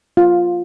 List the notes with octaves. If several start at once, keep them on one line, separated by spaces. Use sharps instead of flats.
F4